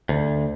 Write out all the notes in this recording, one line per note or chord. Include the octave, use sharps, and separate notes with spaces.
D2